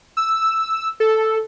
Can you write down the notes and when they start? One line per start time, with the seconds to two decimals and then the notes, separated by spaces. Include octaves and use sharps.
0.17 E6
1.00 A4